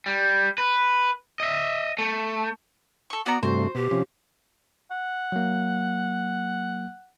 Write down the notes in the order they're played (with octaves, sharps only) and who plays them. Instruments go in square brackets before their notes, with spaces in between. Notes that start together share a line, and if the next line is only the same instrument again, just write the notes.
[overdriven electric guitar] G3
B4
D#5 E5
A3
[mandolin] A4 C#6
[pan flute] B3 [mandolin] F#4 D5 A#5
[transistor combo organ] G2 C3 A3 [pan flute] F#4 [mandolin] C5
[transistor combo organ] B2 [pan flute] G4
[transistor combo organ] C3 F3 C#4
[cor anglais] F#5
[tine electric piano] F#3 A#3